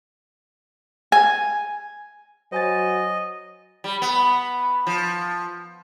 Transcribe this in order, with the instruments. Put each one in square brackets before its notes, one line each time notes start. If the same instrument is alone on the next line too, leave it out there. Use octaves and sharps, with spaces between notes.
[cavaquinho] G#5
[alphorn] F#3 [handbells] C5 G#5 A6 [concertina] D#5
[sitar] G3
B3
F3